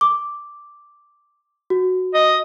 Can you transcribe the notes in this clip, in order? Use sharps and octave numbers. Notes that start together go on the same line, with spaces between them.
D6
F#4
D#5